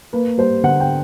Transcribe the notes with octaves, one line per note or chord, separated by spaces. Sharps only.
A#3 B4
G3 C5
D3 F#5
G5